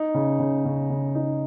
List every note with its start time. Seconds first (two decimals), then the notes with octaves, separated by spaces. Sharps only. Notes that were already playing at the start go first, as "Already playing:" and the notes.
Already playing: D#4
0.14 C#3
0.39 C#3
0.65 C#3
0.90 C#3
1.15 D#4